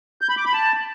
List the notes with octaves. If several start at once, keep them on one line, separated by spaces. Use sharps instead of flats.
G6
B5
D6
B5
A5